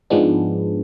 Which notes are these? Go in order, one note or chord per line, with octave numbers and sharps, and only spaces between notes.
G#2 F3 G#3 B3 D4